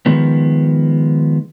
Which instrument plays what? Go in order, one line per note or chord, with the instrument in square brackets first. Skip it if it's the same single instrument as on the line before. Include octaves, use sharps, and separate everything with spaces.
[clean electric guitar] D#3 F3 G#3 B3